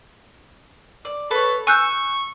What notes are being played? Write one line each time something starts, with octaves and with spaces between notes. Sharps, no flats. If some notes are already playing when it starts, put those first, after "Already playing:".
D5
A4 B4 C#5
G#5 C#6 E6 F#6 G6